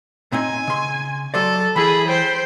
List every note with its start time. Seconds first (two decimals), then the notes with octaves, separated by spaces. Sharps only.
0.32 A#2 C4 D#4 G#5
0.67 C#3 C6
1.34 F#3 A4 C5 D5
1.76 E3 E4 G#4 B5
2.08 C5 G5